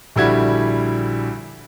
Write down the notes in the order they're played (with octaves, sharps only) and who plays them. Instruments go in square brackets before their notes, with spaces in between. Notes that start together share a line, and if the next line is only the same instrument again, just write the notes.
[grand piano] A#1 D3 G3 E4 F#4 G#6